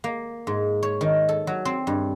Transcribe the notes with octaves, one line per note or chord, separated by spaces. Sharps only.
A#3
G#2
C#5
D#3
A4
F#3
C4
G2